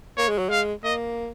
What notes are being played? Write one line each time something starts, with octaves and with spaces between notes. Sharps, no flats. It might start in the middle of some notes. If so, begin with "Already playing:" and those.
A#3 C#5
G#3
F#3
G#3 F5
A#3 D#5